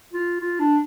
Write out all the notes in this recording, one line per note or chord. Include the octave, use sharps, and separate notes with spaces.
F4
F4
D4